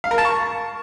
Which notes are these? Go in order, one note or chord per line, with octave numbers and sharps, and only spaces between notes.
F5
A#4
A5
C#6